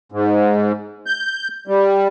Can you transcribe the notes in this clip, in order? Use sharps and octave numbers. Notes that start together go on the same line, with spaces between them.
G#2
G6
G3